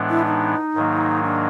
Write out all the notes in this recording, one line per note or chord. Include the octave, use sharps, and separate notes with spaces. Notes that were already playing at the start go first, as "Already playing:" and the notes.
Already playing: A2 E3 G#3 B3 D4
E4
D#4
G#2 D#3 F#3 A#3
D4